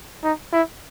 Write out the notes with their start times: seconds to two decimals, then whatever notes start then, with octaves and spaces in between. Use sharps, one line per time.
0.24 D#4
0.53 E4